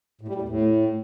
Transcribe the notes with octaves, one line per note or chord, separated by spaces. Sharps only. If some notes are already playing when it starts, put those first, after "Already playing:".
A2
G3
A2
E2
A2